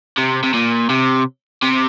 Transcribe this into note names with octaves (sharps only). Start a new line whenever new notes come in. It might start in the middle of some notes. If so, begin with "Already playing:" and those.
C3
C3
A#2
C3
C3